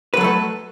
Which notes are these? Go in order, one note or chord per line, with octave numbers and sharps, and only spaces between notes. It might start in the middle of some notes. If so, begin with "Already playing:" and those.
F#3 A3 A4 B4